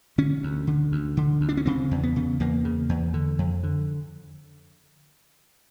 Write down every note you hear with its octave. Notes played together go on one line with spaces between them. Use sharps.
D3 C#4
D2
D3
D2
D3
D2
D4
C#4
C#3 C4
E2
B3
C#3
E2 A#3
C#3
E2
D3
F2
D3